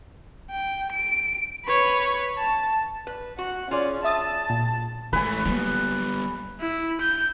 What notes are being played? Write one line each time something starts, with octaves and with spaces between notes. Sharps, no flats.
G5
D7
B4 C#5
A5
B4
F#4 F#5
C#4 F4 G#4 D5
E5 A5 D#6 A6
A#2
E3 G#3 A3 B4 G#5
F#3 G3 A#3 B3
E4
G6